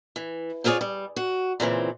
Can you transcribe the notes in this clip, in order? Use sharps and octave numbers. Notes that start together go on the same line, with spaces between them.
E3
C4 E4 F4 G#4 C#5 D5
G3
F#4
A#2 C#3 E3 C4